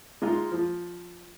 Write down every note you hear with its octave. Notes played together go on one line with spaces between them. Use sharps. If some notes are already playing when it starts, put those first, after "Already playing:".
G#3 D#4 F4
F3